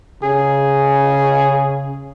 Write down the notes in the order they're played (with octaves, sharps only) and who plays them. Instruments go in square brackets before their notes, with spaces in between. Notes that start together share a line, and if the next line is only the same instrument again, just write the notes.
[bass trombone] C#3 [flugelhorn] G#4